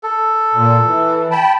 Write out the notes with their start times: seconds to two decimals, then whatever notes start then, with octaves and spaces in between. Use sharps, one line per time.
0.03 A4
0.54 A#2
0.86 E3
1.31 G5 A5 B5